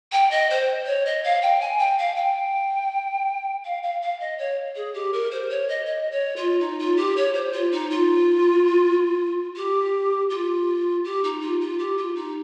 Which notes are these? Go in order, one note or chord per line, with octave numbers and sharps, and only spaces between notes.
G5
D#5
C5
C#5
D#5
F5
G5
G#5
G5
F5
G5
F5
F5
F5
D#5
C#5
G#4
G4
A#4
C5
C#5
D#5
D#5
C#5
F4
D#4
F4
G4
C#5
C5
F4
D#4
F4
G4
F4
G4
D#4
F4
F4
G4
F4
D#4